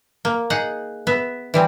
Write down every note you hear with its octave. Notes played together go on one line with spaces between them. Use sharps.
A#3
D#4 G#4 F#5
B3 E5
E3 G3 C4